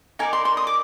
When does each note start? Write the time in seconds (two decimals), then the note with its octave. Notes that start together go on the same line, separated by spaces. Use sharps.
0.19 D#4 A#4 D5 G#5
0.33 C6
0.45 C6
0.57 D#6
0.67 D6